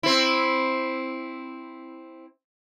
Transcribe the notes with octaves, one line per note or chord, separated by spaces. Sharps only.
C4 E4